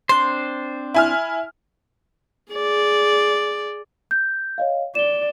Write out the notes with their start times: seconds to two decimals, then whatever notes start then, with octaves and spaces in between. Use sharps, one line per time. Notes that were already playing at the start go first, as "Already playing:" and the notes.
0.09 C4 D4 C5 C6
0.94 E4 G#5 F6
2.52 G#4 D5
4.11 G6
4.58 C#5 D#5 F5
4.95 D5 E7 G7